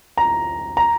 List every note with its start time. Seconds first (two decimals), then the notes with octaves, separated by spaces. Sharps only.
0.18 A#5
0.77 A#5